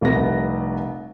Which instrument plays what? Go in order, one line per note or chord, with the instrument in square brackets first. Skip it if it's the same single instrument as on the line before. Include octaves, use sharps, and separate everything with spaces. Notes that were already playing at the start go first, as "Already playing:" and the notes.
[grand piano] F1 C2 B3 A#6